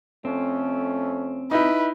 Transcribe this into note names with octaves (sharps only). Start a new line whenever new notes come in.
F2 A3 C4 C#4
D#4 E4 B4